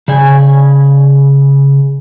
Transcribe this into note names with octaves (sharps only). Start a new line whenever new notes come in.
C#3 D5 G#5